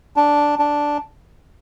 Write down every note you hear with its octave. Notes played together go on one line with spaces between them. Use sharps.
D4
D4